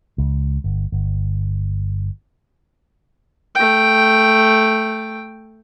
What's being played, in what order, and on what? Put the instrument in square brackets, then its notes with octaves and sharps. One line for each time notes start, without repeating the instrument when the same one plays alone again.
[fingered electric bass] C#2
G1
G1
[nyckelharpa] A3 G5